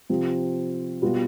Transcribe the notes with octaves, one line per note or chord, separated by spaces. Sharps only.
C3 F3 C4
B2 G3 B3 F4